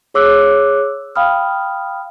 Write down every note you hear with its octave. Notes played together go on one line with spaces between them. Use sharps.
G#4 C#5 D6 E6 F#6
F5 G5 B5 D#6 F6